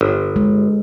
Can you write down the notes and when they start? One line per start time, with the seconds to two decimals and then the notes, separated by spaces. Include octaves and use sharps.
0.01 G1
0.36 G#3